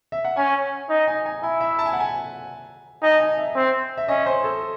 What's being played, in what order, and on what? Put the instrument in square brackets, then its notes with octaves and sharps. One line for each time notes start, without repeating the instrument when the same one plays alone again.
[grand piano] E5
F#5
[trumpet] C#4 [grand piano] G#5
[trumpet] D#4
[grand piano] G#5
G#5
[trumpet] E4 [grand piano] G#5
[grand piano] E5
A5
G#5
F#5
G#5
[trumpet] D#4 [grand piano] G#5
[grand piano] A5
G#5
E5
[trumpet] C4
[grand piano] E5
[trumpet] C#4 [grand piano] D#5
[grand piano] C5
A4